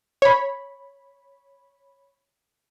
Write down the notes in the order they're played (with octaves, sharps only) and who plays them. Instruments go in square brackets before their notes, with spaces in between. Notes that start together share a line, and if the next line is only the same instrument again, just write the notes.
[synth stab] C#5 B5